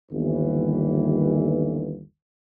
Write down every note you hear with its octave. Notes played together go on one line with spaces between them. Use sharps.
G1 D#2 E3